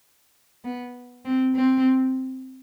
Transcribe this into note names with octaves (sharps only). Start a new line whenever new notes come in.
B3
C4
C4